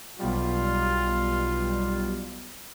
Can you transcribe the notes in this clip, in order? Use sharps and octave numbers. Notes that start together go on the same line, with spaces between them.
B1 B2 G3 F4